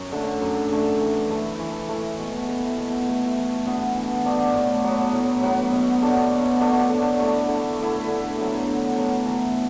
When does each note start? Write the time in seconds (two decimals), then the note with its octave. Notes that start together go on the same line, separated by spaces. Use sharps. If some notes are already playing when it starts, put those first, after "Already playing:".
Already playing: F#2
0.12 D3 A3
0.41 F#2
0.72 D3 A3
1.01 E3
1.30 A3 E4
1.59 E3
1.89 A3 E4
2.18 B2
2.48 A3 E4
2.77 B2
3.06 A3 E4
3.36 E3
3.66 B3 D4 F#4
3.96 E3
4.25 B3 D4 F#4
4.54 A2
4.84 F#3 B3
5.13 A2
5.42 F#3 B3
5.72 B2
6.02 A3 D4 F#4
6.31 B2
6.60 A3 D4 F#4
6.90 D3
7.20 A3 E4
7.48 D3
7.79 A3 E4
8.08 D3
8.37 F#3 B3
8.67 D3
8.96 F#3 B3
9.25 E3